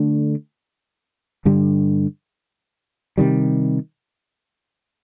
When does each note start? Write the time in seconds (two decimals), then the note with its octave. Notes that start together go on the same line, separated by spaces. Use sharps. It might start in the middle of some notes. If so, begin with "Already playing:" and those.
Already playing: D3 A3 D4
1.45 G2 D3 G3
3.18 C3 D#3 G3